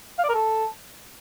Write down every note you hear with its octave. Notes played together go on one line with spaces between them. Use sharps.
F5
D5
A#4
A4